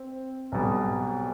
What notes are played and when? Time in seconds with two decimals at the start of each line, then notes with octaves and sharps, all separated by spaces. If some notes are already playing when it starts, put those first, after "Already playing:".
Already playing: C4
0.52 B1 B2 G3